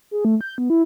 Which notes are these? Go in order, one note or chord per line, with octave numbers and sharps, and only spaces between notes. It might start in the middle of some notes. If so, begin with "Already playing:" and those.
G#4
A3
G6
B3
E4